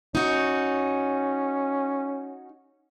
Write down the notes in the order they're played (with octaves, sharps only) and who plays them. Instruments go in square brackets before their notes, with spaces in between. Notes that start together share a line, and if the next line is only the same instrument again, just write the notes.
[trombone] C#4 [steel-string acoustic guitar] D#4 F#4